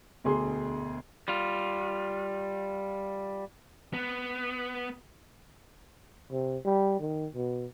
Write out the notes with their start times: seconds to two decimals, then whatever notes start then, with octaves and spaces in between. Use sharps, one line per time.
0.24 E1 D2 G#4 C6
1.28 G3 F4
3.93 B3
6.31 C3
6.65 G3
7.00 D#3
7.35 B2